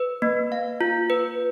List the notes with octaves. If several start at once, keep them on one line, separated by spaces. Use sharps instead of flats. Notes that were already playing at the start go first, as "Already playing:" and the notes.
Already playing: B4
A#3
F5
F4
B4